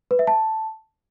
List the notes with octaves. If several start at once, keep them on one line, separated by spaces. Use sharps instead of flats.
B4
E5
A5